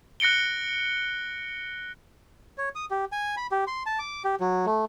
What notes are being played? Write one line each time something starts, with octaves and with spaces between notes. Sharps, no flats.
F#6 A#6 C#7 D7 G7
C#5
D#6
G4
G#5
B5
G4
C6
A5
D6
G4
F#3
A3